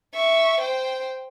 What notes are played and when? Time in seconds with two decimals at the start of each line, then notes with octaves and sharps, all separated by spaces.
0.14 E5 C#6
0.61 C5 G5